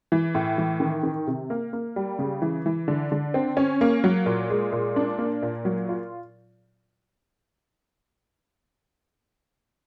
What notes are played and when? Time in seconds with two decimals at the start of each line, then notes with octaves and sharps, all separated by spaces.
0.12 E3
0.35 A2
0.58 E3
0.80 D#3
1.03 D#3
1.27 C3
1.50 A#3
1.73 A#3
1.96 G3
2.19 C#3
2.42 E3
2.66 E3
2.88 D3
3.12 D3
3.34 C4
3.57 C#4
3.81 A#3
4.04 F#3
4.26 A#2
4.50 G#3
4.72 A#2
4.96 D4
5.18 A#3
5.42 A#2
5.65 F#3
5.89 F4